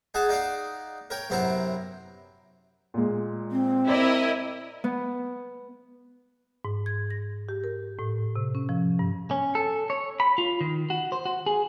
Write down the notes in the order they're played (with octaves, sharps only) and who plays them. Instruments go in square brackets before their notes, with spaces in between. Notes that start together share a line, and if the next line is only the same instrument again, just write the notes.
[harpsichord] D#4 G#4 F#5 A5
D#4 D5 F5 F#5
A#4 C#5 G5
F#2 C3 B3 C4 E4 A#5
[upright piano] A#2 G#3
[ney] C4
[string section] E4 A#4 D#5 [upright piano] C5 D5
[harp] B3
[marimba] G#2
G#6
A#6
G4
A#4
A2
C3
C#4
F3
G2
[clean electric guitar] C#4
A4
C#5
B5
F4
D#3
F#4
C5
F#4
G#4